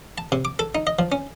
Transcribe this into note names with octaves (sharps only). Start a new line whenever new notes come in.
A5
C3
D6
A4
D#4
D#5
F3
C#4